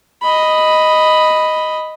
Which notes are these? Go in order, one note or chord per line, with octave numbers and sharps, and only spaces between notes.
D#5 B5